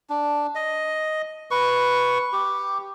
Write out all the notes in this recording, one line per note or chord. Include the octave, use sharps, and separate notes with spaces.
D4
D#5
B4 C#6
G4